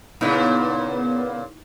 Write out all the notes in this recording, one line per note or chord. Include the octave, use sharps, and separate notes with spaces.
A#2 C#3 B3 D#4 E4